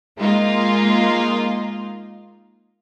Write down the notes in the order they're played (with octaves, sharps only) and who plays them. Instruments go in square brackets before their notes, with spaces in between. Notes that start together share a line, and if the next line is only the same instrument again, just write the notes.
[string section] G#3 A#3 D#4 F4